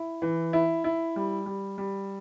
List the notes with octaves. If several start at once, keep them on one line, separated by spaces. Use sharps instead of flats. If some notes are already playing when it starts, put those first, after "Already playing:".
Already playing: E4
E3
E4
E4
G3
G3
G3